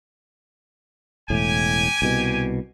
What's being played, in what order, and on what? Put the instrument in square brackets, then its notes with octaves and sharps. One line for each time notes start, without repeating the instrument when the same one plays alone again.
[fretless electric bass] E1 A2 [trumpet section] G4 G#5
[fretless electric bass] C2 B2